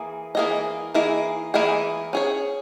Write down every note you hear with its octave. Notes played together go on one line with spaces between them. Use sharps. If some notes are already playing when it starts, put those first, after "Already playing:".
Already playing: E3 A#3 G#4
E3 A#3 E4 G#4 D#5
E3 A#3 E4 G#4 D#5
E3 A#3 E4 G#4 D#5
C#4 G#4 C#5